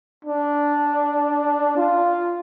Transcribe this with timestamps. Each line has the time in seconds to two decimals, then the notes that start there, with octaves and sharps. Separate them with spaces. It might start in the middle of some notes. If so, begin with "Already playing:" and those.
0.25 D4
1.77 F4